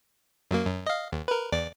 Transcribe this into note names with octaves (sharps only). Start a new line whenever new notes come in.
F#2 F#3 A#3
F#2
D#5 F5
D#2
A#4 B4
E2 D5 D6